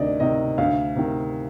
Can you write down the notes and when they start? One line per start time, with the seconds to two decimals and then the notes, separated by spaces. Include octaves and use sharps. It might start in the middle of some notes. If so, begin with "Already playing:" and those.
Already playing: D2 C3 D#3 D5 D#5
0.20 C3 D#3 D#5
0.58 D2 F5
0.96 C3 D#3